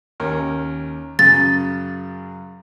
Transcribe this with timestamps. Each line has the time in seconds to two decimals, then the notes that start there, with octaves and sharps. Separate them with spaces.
0.20 D#2 C#4 A#4
1.19 F#2 C#3 A6